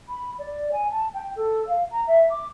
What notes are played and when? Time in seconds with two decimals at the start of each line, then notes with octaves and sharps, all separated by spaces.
0.08 B5
0.38 D5
0.72 G#5
0.90 A5
1.14 G5
1.35 A4
1.67 F5
1.91 A#5
2.07 E5
2.30 D6